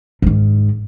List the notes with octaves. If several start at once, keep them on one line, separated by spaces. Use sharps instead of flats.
G#2 D#3